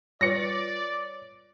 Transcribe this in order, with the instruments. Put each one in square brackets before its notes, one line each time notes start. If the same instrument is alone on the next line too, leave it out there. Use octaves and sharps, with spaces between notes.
[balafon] G3 F4 B4 [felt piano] C#5 [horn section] D5 [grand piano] A#6 C#7